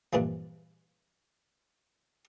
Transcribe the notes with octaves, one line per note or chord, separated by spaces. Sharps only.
G2 A#2 E3 F3